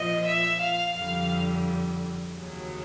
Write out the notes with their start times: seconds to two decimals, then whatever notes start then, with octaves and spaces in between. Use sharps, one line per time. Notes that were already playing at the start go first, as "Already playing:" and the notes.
Already playing: A#2 F3 D#5
0.27 E5
0.61 F5
0.96 F2 D3 G3 F5
2.36 D#2 C#3 F#3